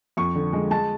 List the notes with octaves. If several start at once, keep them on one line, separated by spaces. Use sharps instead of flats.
F2 C#6
D3
G#3
G#3 A5